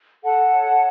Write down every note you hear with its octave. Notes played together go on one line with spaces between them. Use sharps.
A4 F#5 A5
C#5